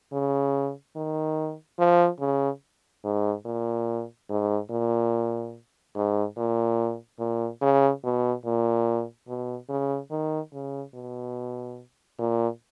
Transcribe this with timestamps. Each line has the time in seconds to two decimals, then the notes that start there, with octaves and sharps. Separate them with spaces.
0.13 C#3
0.96 D#3
1.79 F3
2.20 C#3
3.04 G#2
3.45 A#2
4.29 G#2
4.70 A#2
5.95 G#2
6.37 A#2
7.19 A#2
7.61 C#3
8.04 B2
8.45 A#2
9.28 B2
9.69 C#3
10.11 D#3
10.53 C#3
10.94 B2
12.19 A#2